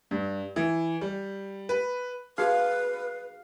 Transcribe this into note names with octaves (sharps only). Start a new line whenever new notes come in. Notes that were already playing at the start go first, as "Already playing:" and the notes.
G2
E3
G3
B4
D#4 F#4 G#4 B4 F5